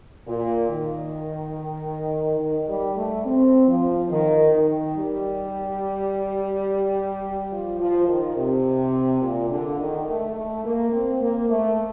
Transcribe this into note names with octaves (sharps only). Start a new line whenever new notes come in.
A#2
D#3
D#3
G3
A3
C4
F3
D#3
D#3
G3
F3
F3
D#3
C3
A#2
D3
D#3
A3
A3
A#3
C4
A#3
A3